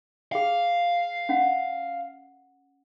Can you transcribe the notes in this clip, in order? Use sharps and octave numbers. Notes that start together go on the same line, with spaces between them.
G#4 F5 G5
C#4 F#5